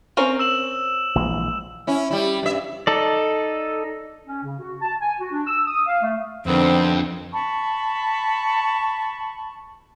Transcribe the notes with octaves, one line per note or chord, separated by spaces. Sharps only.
C4 C#4 A#4
E6 E7 F#7
A#1 E3 G#3
C#4 E4
G3 E4
G2 E5
D#4 A4 D5
C#4
C#3
F#4
A5
G#5
F#4
D4
E6
D#6
F5
A3
F2 D3 D#3 B3 C4
A5 B5 C#6